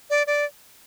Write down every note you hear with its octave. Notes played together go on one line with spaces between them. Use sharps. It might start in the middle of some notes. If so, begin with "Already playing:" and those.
D5
D5